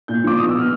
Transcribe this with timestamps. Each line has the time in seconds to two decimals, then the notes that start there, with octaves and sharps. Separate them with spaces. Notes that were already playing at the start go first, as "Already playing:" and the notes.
0.08 A#2 G6
0.24 F3 D6
0.38 B2 D#6
0.49 E6
0.54 B2 F6